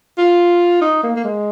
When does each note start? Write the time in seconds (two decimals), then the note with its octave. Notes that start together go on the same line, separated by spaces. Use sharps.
0.18 F4
0.82 D#4
1.03 A#3
1.16 A#3
1.24 G#3